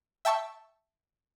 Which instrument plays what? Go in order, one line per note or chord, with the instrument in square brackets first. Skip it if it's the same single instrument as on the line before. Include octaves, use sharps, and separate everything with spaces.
[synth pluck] E5 G5 A5 C#6 E6